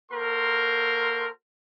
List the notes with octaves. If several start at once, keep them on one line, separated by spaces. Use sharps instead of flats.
A#3 F#4 A4 A#4 C5 C6